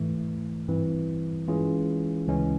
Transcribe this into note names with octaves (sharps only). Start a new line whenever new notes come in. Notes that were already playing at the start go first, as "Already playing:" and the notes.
Already playing: G#2 E3 A3
G2 E3 G3 C4
E3 G#3 C#4 F4 G#4
D2 C#3 E3 G#3 C#4